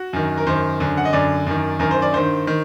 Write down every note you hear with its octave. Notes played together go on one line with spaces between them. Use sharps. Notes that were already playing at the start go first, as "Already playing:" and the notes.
Already playing: F#4
F#2 D#3
A#4
F#2 D#3 C5
F#2 D3
F#5
D#5
F#2 D3 D5
F#2 D#3
F#2 D#3 A#4
C5
D5
G2 D#3 C5
D#3